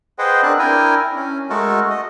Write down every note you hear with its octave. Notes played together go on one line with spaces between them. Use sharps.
G#4 B4 C5 D#5 F#5 G5
C4 D4 A#4 B4 D5 F#6
D4 E4 A#4 G5 G#5 A#5
C#4
G#3 A3 F#4 A4 A#4
D#5